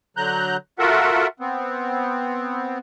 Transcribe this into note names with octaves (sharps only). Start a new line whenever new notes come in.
D3 F#3 A#5 F#6 G6
F4 F#4 A4 A#4 E5 F#5
B3 C4